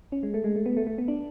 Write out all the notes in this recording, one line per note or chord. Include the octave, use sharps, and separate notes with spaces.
C#4
G#3
A3
G#3
A3
B3
A3
A3
B3
D4